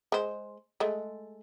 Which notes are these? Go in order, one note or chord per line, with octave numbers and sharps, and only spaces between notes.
G#3 C5
G#3 A3